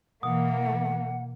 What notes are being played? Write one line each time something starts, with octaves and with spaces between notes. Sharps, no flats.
B2 E3 A#3 F#5